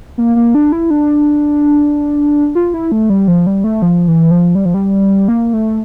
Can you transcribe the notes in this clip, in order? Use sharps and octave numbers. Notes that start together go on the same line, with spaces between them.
A#3
A#3
D4
E4
D4
F4
E4
A3
G3
F3
G3
A3
F3
E3
F3
G3
F3
G3
A#3
A3